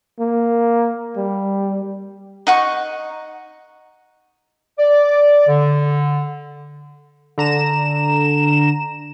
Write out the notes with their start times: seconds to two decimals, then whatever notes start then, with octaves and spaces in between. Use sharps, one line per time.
0.19 A#3
1.16 G3
2.47 D#4 F#5 C#6
4.79 D5
5.48 D3
7.38 D3 A#5 E7